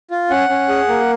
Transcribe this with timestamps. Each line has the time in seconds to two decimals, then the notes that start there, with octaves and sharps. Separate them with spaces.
0.11 F4
0.30 C#4 F#5
0.49 C#4
0.69 G#4
0.88 A#3